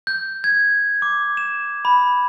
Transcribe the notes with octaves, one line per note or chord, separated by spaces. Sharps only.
G6
G#6
D6
E7
B5